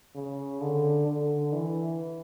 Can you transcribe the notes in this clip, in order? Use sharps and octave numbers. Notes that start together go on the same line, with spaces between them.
C#3
D3
D3
E3